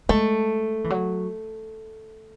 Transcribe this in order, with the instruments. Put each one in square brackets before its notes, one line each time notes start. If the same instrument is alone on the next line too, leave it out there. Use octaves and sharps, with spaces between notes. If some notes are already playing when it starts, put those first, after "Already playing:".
[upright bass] G#3 [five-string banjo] A3
[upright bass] E3
F#3